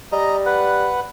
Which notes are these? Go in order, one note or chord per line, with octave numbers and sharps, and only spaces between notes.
G3 D#5 A#5
B4 F#5